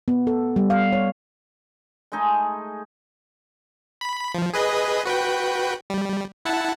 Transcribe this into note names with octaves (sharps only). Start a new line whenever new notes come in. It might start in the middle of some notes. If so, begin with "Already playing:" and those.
B3
A4
G3
F5
C#5
G#3 A3 D#4 G#4
B5
F3
G#4 B4 D#5
F#4 B4 G5
G3
E4 F#5 A5